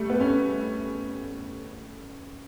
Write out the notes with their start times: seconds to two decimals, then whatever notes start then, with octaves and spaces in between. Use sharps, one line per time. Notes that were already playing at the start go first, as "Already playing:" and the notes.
Already playing: G3 A3
0.10 B3
0.20 C#4